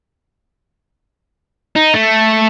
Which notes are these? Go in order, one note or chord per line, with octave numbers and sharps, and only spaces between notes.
D#4
A3